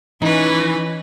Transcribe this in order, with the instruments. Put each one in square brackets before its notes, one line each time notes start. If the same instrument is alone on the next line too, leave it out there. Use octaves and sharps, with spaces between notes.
[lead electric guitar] E3 [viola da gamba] C#4 B4 [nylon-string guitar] D#4